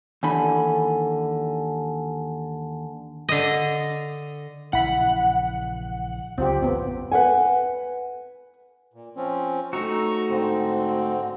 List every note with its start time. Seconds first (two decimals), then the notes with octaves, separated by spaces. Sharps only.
0.23 D#2 D3 E3 G#5 B5
3.29 D3 D#5
4.73 A#1 C#3 E3 E4 F#5 B5
6.38 C#2 D3 F#3 C4 F4 G4
6.62 A1 F2 A2 B3 C4
7.12 B4 C#5 F#5 G#5
8.93 A#2
9.16 F3 C4 C#4
9.73 A3 D#4 F#4 A#5 C#6 E6
10.30 G#2 D3 C4